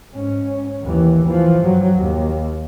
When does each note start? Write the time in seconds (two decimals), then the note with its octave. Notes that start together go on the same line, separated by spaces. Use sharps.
0.11 G#2 C#4
0.83 D#2 E3
1.25 E3 F3
1.60 G2 F#3
1.96 D#2